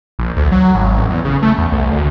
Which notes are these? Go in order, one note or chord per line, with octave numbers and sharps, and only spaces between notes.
A#1
D2
F#3
G#1
A1
E2
C#3
A3
E2
C2
D2